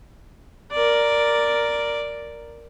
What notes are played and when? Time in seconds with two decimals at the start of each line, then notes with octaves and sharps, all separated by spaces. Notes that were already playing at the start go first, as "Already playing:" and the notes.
0.71 A#4 D5